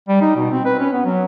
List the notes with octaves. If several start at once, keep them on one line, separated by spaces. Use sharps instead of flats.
G3
D#4
B2
C4
B4
C#4
B3
F#3